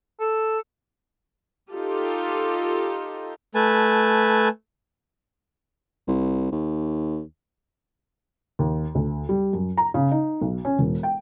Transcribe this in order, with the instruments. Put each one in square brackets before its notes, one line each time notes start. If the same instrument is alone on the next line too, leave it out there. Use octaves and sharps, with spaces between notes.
[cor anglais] A4
[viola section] D#4 F4 G4 A4
[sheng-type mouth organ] A3 B4 G#5 A5
[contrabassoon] C2
D#2
[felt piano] D#2
D2
G3
F#2
A#5
C#3
D#4
B1
C#4
E1
G5